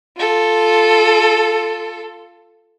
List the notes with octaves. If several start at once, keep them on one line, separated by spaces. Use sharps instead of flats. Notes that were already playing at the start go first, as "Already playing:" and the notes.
F4 A4